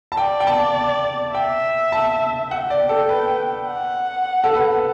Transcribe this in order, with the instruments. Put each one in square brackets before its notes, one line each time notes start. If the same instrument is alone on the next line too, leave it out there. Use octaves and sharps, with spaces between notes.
[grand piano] A5
[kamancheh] D5 [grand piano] G5
[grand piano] G5
A5
[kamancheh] E5 [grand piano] G5
[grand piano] A5
[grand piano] F#5 [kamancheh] G5
[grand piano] D5
A4
B4
[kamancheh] F#5
[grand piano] A4
B4